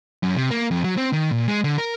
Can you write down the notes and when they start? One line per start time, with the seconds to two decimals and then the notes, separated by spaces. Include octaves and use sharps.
0.23 F#2
0.37 C3
0.51 A#3
0.71 F2
0.84 F#3
0.97 C4
1.13 D#3
1.32 A#2
1.48 G#3
1.64 D3
1.78 A#4